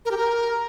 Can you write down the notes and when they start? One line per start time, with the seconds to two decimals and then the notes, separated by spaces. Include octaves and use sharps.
0.05 A#4
0.11 G4
0.17 A#4